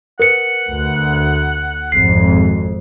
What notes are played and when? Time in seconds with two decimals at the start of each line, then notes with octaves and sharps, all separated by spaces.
0.20 A#4 B4 F#5 C#7
0.68 D2
1.92 G#1 F2 C7